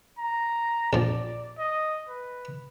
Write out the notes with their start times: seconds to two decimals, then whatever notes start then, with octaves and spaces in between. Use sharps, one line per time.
0.18 A#5
0.93 A#1 F3 D5
1.58 D#5
2.08 B4